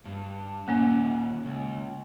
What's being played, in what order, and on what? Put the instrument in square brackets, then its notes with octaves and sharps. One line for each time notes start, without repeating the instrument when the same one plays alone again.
[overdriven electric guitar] G2
[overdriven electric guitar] D#2 A#2 [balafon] A#3 C#4 G#5
[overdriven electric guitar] C#2